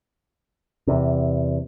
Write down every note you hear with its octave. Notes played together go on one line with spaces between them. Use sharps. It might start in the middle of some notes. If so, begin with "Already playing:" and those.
E2 C3